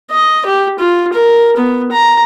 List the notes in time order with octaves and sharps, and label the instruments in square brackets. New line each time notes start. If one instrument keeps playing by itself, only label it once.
[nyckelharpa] D#5
G4
F4
A#4
B3
A#5